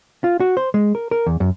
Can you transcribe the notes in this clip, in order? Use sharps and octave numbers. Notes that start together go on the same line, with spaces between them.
F4
F#4
C5
G#3
A#4
A#4
E2
F#2